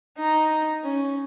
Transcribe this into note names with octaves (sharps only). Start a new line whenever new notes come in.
D#4
C#4